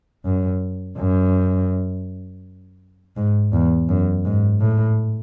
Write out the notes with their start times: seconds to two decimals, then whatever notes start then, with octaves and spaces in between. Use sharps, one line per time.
0.25 F#2
0.98 F#2
3.17 G#2
3.53 E2
3.88 F#2
4.25 G#2
4.61 A2